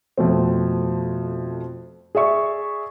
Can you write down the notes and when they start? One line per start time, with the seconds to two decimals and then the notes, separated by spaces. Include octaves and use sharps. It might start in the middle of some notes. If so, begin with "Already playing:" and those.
0.18 F2 B2 A3 C4
2.15 G#4 D5 E5 C#6